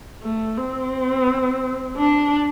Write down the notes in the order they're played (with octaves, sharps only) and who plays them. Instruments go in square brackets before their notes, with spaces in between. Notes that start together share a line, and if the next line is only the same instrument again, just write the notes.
[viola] A3
C4
D4